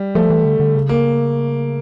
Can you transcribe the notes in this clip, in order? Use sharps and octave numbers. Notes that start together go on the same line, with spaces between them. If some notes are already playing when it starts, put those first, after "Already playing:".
Already playing: G3
F3 A3
E3
D3
D3
C#3
A#3